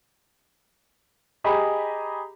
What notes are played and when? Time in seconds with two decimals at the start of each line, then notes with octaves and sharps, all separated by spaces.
1.44 G4 G#4 D#5 A#5 B5